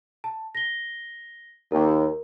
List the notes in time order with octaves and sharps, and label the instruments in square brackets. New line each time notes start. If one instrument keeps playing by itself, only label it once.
[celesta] A5
A#6 G7
[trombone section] D#2 [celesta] A#4